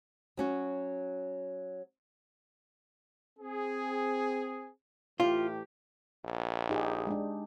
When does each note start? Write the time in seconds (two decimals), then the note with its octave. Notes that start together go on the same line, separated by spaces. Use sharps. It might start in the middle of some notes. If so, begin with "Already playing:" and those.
0.37 F#3 C#4 F#4
3.37 C4 G#4
5.20 A2 E3 F4 G4
6.24 A#1
6.70 D#4 G4 G#4
7.07 G#3 D4